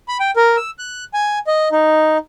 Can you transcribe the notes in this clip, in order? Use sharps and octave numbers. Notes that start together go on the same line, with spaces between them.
B5
G5
A#4
E6
F#6
G#5
D#5
D#4